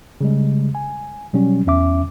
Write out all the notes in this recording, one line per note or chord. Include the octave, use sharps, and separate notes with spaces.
C#3 G3 G#3
G#5
B2 F#3 G3 C#4
E2 C#4 E5 D6